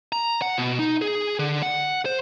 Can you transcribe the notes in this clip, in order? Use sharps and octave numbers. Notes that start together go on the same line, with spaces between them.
A#5
F#5
B2
D#4
G#4
D3
F#5
C5